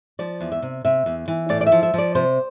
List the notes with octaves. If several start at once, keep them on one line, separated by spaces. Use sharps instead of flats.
F3 D5
E2
E5
C3
C3 E5
E2
E3
A2 D5
D5
E5
F3
E5
F3 D5
C3 C5